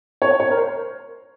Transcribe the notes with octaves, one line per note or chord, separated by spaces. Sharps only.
C#5
C#5
A#4
C5